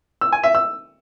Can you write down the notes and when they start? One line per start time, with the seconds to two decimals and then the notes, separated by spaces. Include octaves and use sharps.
0.21 E6
0.32 G#5
0.44 E5
0.55 E6